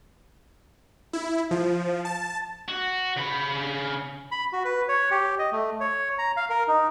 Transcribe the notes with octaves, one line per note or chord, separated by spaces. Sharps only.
E4
F3
A5
F#4
C#3 B5
B5
F#4
B4
C#5
G4
D#5
A3
C#5
A#5
F5
A#4
D#4